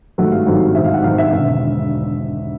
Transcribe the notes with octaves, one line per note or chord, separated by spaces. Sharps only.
G#1 G2 D#3 F#3 A3 F#5
F5
G#1 G2 D#3 F#3 A3
G#1 G#2 D#3 E5
F5
F#5
G#1 G#2 D#3 F5
E5
E1 D3 E5